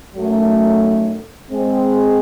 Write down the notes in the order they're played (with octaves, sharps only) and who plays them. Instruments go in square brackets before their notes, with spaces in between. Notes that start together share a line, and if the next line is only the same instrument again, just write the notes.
[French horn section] F#2 D#3 F#3 A3
G#3 C4